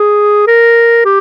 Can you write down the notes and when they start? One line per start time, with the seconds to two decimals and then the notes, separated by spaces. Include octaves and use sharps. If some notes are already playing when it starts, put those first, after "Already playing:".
Already playing: G#4
0.47 A#4
1.05 G4